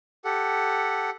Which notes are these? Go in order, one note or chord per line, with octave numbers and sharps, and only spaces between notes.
G4 A4 F#5